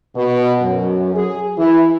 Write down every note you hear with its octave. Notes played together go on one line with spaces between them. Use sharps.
B2
F#2
G#4
E3